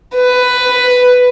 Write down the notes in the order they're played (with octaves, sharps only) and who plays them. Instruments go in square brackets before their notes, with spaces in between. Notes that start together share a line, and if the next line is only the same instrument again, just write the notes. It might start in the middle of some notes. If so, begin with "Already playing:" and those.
[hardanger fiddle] B4